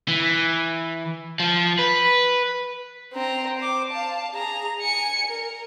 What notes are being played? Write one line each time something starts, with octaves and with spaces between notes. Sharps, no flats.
E3
F3
B4
C4 A#5
C5 D6
F5 A5
G#4 A#5
G#5 C#7
A#4